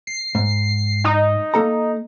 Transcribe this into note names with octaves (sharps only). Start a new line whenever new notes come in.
C7
G#2
D#4
A#3 A4 A#5